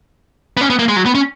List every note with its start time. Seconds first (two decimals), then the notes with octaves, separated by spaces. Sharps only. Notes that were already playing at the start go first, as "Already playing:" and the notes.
0.57 B3
0.61 C#4
0.70 B3
0.79 A#3
0.88 G#3
0.96 F#3
1.06 B3
1.15 C#4